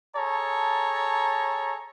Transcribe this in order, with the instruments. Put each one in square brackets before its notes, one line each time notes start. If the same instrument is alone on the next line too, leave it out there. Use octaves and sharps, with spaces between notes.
[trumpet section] G#4 A4 C#5 A5 A#5